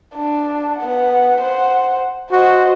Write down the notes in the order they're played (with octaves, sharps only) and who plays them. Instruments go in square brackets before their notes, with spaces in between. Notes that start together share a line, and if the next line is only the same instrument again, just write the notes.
[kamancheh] D4
B3 F#5
C5 F#5
[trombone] F#4 [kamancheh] C5 D#5